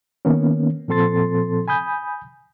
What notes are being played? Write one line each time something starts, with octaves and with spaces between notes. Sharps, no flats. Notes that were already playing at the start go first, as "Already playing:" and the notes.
D#3 A#3 B3 C#4
A#2 F3 C4 A4 C6 A6
G#5 B5 D#6 G6